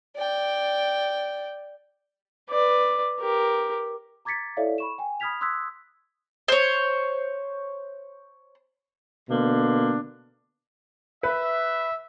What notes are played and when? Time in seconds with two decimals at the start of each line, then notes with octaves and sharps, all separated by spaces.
0.16 D5 G5
2.50 B4 D5
3.21 G4 A#4
4.25 A#5 D6 G#6 A6 B6 C#7
4.57 E4 A4 C#5 D5 E5 F5
4.78 B5 C#6 E7
4.98 G5 G#5
5.20 B5 D#6 F6 G#6 B6 F7
5.41 C6 D#6 E6 F#6 G#6 B6
6.48 C5 C#5
9.29 B2 D3 A#3 D4
11.23 B4 E5